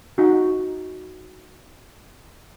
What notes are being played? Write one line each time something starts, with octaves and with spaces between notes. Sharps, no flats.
D#4 F#4